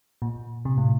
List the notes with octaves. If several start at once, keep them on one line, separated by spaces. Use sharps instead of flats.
A#2
C3
A2